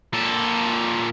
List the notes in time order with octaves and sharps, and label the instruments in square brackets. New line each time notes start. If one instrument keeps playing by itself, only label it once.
[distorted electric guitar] A#2 A4